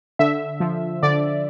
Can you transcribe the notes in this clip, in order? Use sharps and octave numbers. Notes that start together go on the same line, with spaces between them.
D3 E5
F3
D3 D5